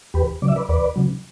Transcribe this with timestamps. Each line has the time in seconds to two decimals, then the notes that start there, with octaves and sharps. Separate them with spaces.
0.14 E2 G4 B4
0.42 C#3 F#3 D5
0.48 E5
0.56 B4 D5
0.69 E2 B4 D5
0.96 C#3 F#3